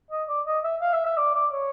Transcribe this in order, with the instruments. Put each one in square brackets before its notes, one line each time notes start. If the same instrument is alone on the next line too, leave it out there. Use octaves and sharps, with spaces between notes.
[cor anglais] D#5
D5
D#5
E5
F5
E5
E5
D5
D5
C#5